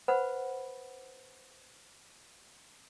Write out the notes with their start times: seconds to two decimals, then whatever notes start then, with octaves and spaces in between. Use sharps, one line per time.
0.08 B4 C5 F#5 B5